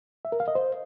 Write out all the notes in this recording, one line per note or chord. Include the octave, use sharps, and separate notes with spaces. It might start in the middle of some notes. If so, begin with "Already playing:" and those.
E5
A#4
F5
D#5
C5